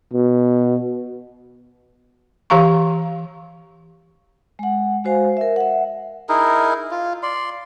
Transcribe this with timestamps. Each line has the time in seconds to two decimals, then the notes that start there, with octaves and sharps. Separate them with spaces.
0.13 B2
2.50 E3 G4 F5 A#5 C#6
4.59 G#3 F#5
5.04 G#3 F#4 C5 F5 G#5
5.37 A#4 E5
5.56 E5 F#5
6.29 D#4 E4 G#4 A#4
6.91 F4
7.23 D5 C6